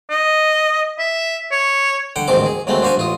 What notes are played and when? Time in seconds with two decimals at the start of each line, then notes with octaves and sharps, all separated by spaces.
0.10 D#5
0.99 E5
1.52 C#5
2.16 D3 F#5 G5
2.28 A1 D2 G#2 D#3 C4 D6
2.46 G#4
2.67 D#2 F#3 G#3 A3 C4
2.82 D4 F#4 C5 F5 G#5
2.97 A1 F4 D#6